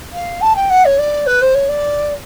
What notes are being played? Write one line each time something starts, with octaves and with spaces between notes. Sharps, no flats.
F5
A5
G5
F#5
C#5
D5
B4
C5
C#5
D5